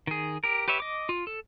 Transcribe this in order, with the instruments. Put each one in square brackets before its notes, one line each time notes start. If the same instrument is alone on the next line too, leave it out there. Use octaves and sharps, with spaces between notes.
[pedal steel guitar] D#3 G#4
G4 A#4
G4 B4 C#5 E5
D#5 D6
F4
A4